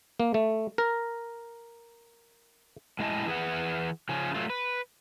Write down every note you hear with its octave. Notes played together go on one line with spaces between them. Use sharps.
A#3
A3
A#4
A2 G#3 E4 D#5 G#5 A5
E3 G#4 B4 F#5
C#3 F3 C#4
F#3 A3 F4
B4